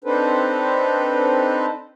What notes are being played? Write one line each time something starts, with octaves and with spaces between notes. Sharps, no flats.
C4 D4 D#4 A4 B4 C5